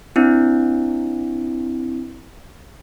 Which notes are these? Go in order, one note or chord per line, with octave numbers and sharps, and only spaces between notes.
C4 D4 E4